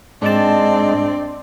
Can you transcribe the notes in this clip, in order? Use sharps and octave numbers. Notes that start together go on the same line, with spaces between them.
G#2 G#3 C4 D4 D5 D#5 A5